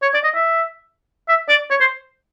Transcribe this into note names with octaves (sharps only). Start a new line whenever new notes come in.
C#5
D5
D#5
E5
E5
D5
C#5
C5